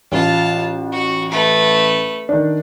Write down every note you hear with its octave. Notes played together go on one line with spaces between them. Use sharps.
A1 F4 A5
F#4
A3 B4
D#3 D4